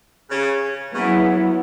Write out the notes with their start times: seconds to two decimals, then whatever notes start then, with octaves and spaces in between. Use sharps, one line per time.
0.30 C#3
0.93 C#3 F#3 B3 E4